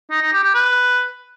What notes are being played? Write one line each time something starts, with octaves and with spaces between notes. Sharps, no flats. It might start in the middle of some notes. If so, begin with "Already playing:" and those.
D#4
D#4
G4
G4
B4